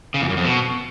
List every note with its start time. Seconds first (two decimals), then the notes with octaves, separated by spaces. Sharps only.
0.14 C#3
0.22 E2
0.29 F#2
0.37 F2
0.45 B2